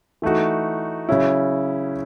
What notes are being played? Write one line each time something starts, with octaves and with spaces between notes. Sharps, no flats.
E3 A3 D#4 F#4
C#3 F#3 C#4 E4